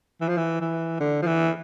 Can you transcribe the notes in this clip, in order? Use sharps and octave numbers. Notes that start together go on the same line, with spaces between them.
E3
F3
E3
E3
D3
F3
E3